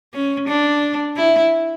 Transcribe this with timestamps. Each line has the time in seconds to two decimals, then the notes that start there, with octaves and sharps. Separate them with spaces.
0.14 C#4
0.48 D4
1.17 E4